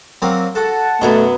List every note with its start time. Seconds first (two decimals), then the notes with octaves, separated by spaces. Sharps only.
0.22 F#3 A#3 C4
0.55 F#4 A4 F#5 A5
1.01 F#2 B2 F#3 A3 B3